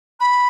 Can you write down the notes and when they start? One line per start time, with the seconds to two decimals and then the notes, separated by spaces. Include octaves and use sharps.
0.20 B5